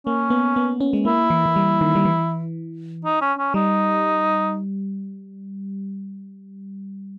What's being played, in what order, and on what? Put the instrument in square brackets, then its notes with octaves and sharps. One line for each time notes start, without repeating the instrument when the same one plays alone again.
[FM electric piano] A#3 [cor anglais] C#4
[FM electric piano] B3
B3
C#4
G#3
[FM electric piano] A#3 [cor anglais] E4
[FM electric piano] E3
E3
G3
D#3
G3
E3
[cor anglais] D#4
C#4
C#4
[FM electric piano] G3 [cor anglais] D#4